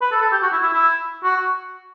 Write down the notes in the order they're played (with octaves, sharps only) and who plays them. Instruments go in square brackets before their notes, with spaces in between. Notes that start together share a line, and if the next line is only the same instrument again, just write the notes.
[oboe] B4
A4
A4
G4
F#4
E4
E4
E4
F#4